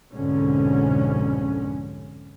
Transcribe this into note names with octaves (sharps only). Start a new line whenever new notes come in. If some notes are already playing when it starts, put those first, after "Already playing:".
C2 F2 G#2 B2 D3 C#4